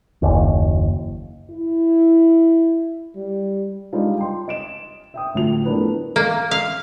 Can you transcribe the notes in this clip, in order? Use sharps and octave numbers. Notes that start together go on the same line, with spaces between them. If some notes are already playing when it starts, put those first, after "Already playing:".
F#1 D#2
E4
G3
G3 G#3 D4 D#4 F4
G5 C6
D#5 D7 E7
E5 G5 D#6
G1 A2 F3 F#3 F7
A3 B3 D4 E4 A#4 B4
A#3
F5